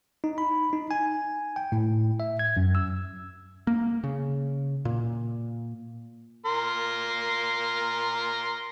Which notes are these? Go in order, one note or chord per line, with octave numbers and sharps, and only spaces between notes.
D#4
B5
D#4
G#5
G5
A2
E5
G#6
F#2
E6
A#3
C#3
A#2
A#4 C6